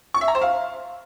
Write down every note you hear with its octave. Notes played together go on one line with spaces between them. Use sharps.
C#6
E5
A#5
C5
F5